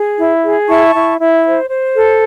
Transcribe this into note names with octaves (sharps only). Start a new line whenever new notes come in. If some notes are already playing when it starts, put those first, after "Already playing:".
Already playing: G#4
E4
G#4
E4 A5 C#6
E4
E4
C5
C5
A4